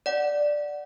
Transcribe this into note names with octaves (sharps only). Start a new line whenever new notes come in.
D5 F#5